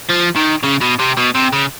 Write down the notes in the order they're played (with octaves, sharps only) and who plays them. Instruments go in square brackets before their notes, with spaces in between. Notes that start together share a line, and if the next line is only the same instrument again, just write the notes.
[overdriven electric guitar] F3
D#3
C#3
B2
C3
B2
C3
C#3